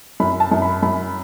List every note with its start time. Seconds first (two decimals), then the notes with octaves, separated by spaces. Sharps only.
0.20 F#2 B5
0.40 A5
0.52 F#2
0.62 B5
0.83 F#2 B5